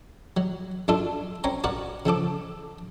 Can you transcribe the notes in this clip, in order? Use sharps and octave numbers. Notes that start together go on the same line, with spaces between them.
F#3
F#2 D4 F4 A4
C4 C#4 G#5 A#5
F#4 A#4 B4 D5 F#5
C#3 F3 A4 D6